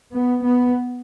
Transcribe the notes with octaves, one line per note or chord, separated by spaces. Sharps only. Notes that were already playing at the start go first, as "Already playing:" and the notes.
B3
B3